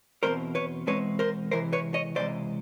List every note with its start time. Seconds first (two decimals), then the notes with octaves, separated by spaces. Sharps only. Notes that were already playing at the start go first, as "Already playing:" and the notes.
0.23 E2 B2 G#3 C4 A#4 C5
0.55 B4 C#5
0.87 E2 B2 G#3 C4 B4 C#5
1.19 A#4 C5
1.51 C#2 C3 E3 A#4 C5
1.73 B4 C#5
1.94 C#5 D#5
2.15 C#2 C3 E3 G#3 C5 D5